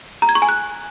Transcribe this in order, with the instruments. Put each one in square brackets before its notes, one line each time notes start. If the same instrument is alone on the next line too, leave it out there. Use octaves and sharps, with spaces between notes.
[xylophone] A#5
G#6
C#6
G#5
F#6